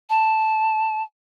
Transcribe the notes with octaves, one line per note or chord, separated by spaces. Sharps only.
A5